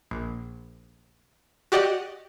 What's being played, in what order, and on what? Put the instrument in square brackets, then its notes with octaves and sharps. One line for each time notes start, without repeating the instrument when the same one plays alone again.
[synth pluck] A#1
F#4 G4 D5 D#5 F#5